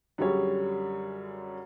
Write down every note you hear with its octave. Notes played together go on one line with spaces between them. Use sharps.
F#2 D3 G3 G#4 C#5